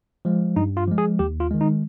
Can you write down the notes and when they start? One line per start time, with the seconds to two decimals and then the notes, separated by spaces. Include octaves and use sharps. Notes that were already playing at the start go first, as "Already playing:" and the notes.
0.25 F3 G#3
0.56 G2 D#4
0.77 F4
0.88 F3 G#3
0.98 G#4
1.19 D#2 G4
1.40 F4
1.51 D#3 G#3
1.61 D#4